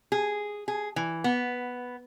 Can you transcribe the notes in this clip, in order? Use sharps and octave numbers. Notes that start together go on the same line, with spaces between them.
G#4
G#4
E3
B3